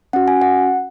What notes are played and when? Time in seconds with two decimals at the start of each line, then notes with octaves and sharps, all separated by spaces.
0.13 C#4 F#4 F#5
0.28 G#5
0.41 F#5